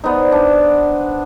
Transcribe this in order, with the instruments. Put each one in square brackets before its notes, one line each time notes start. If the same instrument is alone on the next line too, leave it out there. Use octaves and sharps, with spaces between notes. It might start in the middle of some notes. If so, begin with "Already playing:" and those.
[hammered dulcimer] B3 D#4 [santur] C5 D5
[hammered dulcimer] D4